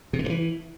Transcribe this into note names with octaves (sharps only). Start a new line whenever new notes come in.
C3
D3
G2
E3